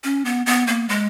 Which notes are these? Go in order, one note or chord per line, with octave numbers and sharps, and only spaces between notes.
C#4
B3
B3
A#3
G#3